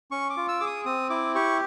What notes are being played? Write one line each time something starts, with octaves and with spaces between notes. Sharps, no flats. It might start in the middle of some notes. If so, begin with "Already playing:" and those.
C#4 C#6
D6
F4
E6
G#4 D6
D#6
C4 D#6
E4 D6
G4 C#6